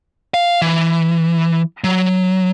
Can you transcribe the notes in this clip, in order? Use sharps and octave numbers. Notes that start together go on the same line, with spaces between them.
F5
E3
F#3